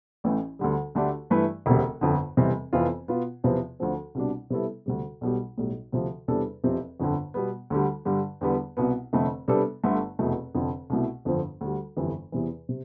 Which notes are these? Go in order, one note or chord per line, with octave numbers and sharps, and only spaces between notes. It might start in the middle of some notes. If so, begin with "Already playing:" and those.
A1 A2 E3
D2 D3 G3
D2 D3 A3 D4 G4
G2 E3 A3 E4 B4
E1 D2 C3
G1 F2 D3
F1 E2 C3 E3 G3
F1 F2 E3 B3 F4
B2 B3 F4
E2 C3 F3 B3 F4
D2 D3 F3 C4
C2 B2 G3 D4
C3 G3 B3 E4 A4
D2 C3 G3
B1 B2 G3
B1 A2 G3
D2 C3 F3
E2 C3 G3 D4 A4
F1 E2 C3 F3 C4
G1 F2 D3
B2 G3 B3
D2 D3 G3
G2 D3 G3
E2 D3 G3 B3
C2 B2 B3
F1 F2 D3 A3
C3 G3 B3 D4 A4
G1 G2 D3 A3
F1 E2 B2 A3
F1 F2 D3
C2 B2 A3 E4
G1 F2 D3 F3 C4
D2 D3 G3
G1 F2 E3 G3
E2 C3 E3
C3